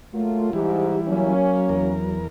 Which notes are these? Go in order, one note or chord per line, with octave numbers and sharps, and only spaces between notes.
F#3 A3 A#3 F4
G#2 E3 G3 E4 G4
F#3 A#3 C#4
E2 A#4